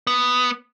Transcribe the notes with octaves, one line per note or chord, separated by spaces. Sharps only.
B3